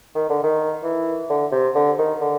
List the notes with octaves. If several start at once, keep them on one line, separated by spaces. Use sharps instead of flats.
D#3
D3
D#3
E3
D3
C3
D3
D#3
D3